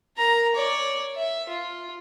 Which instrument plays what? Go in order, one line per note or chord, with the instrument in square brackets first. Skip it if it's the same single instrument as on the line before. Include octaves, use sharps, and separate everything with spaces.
[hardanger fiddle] A#4 A#5
C#5 D5
E5
F4